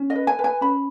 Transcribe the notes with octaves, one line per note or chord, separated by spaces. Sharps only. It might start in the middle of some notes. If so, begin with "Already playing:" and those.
Already playing: C#4
D#5
B4
G#5
B4
G#5
C#4 B5